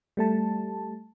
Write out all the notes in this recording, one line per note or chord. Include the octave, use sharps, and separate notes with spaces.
G3 A3 A5